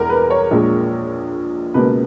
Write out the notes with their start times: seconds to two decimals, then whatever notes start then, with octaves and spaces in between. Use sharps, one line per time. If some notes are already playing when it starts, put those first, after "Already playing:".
Already playing: E1 E2 A#4
0.09 B4
0.30 C#5
0.51 A#1 A#2 G#3
1.74 C#2 B2 A#3 B4